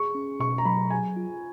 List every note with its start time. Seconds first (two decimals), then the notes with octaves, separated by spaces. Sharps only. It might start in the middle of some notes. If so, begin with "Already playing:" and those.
Already playing: G#4 C#6
0.15 C#4
0.40 B2 C#6
0.58 A#5
0.65 F#3 B5
0.90 G#4 G#5
1.17 F4